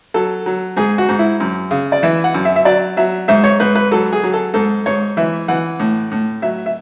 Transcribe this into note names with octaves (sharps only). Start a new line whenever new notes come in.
F#3 A4
F#3
G#2 G#4
F#4
G#2
E4
F#2
C#3
D5
E3 E5
F#5
F#2
E5
E5
F#3 D5
F#3 E5
G#2 E5
C#5
G#2 B4
B4
F#3 A4
G#4
F#3
A4
G#2 A4
G#2 C#5
E3 E5
E3 F#5
A2
A2
F#3 E5
E5